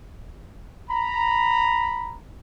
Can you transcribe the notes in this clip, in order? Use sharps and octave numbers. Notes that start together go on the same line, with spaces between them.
A#5 B5